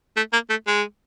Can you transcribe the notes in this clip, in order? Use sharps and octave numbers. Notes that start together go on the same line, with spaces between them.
A3
A#3
A3
G#3